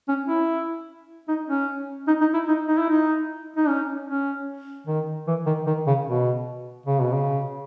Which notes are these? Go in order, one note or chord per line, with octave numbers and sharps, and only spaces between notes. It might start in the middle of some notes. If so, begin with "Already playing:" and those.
C#4
E4
D#4
C#4
D#4
D#4
E4
D#4
D#4
E4
D#4
D#4
C#4
C#4
D#3
E3
D#3
D#3
C#3
B2
C#3
B2
C#3